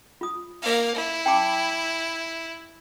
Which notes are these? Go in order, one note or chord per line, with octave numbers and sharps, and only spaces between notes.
F4 D#6
A#3 F5
E4
G5 A5 D6